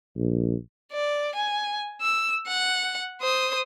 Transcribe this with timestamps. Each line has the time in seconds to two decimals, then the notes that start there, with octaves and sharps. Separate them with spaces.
0.16 A#1
0.92 D5
1.35 G#5
2.01 E6
2.47 F#5
3.21 C5 D#6